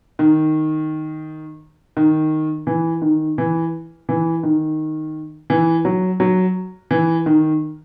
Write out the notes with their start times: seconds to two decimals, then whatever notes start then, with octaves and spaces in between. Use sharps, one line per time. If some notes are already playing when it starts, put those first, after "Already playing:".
0.19 D#3
1.97 D#3
2.67 E3
3.02 D#3
3.38 E3
4.09 E3
4.43 D#3
5.50 E3
5.85 F#3
6.20 F#3
6.91 E3
7.26 D#3